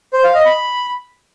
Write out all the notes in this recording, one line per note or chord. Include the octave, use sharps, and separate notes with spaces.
C5
F5
D#5
B5